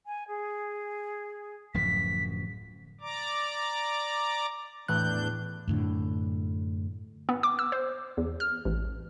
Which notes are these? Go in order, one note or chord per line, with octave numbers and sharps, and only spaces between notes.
G#5
G#4
D1 F#2 F3 B6
D5 A#5 D6
E2 A2 E3 D4 F#6 G6
F#2 A2 D3
B3
D6
E6
C5
E2
F6
A1